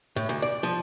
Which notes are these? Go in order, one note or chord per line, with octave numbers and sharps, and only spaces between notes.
A2
D2
D5
F3